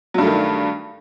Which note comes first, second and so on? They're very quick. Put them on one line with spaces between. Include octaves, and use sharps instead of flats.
F#3 G2 A3 D#3